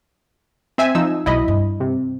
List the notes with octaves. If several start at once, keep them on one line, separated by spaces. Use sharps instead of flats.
C4 E5 G#5
F3 D#4 E6
B1 F#3 E4 D#5 B5
G2
C3